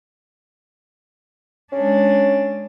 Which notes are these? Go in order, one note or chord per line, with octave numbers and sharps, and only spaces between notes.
G#3 C#4 D4